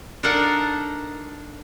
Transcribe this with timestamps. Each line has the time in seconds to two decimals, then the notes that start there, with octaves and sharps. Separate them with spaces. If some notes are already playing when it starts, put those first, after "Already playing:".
0.23 D4 D#4 A4 A#4 F5 F#5